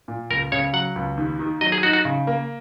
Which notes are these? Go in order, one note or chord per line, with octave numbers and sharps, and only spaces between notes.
A#2
C#2 A#4
C#3 C#5
F#3 F#5
C#2
D#2
D#3
F#3 D#5
G#4
D#4 F#4
F#4
C#3
A#3